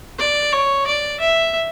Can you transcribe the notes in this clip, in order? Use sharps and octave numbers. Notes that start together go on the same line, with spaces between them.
D5
C#5
D5
E5